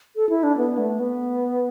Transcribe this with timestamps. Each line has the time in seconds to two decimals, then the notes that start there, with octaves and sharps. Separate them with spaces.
0.16 A4
0.29 E4
0.43 D4
0.58 B3
0.78 A3
0.99 B3